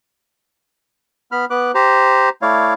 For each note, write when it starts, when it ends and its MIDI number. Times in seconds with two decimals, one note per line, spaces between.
1.32 1.45 59
1.32 1.45 83
1.32 1.45 89
1.50 1.71 59
1.50 1.71 71
1.50 1.71 86
1.50 1.71 90
1.75 2.29 67
1.75 2.29 72
1.75 2.29 82
2.42 2.74 57
2.42 2.74 64
2.42 2.74 73
2.42 2.74 74
2.42 2.74 77